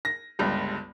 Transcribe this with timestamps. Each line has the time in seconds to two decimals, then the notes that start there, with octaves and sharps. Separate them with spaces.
0.05 A#6
0.39 G1 C#2 G2